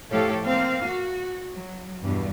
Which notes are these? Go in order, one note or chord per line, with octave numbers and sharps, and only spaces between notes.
A2 F3 G4 A4 C#5 F5
A#3 C4 F5
F#4
F#3
E2 G2 B2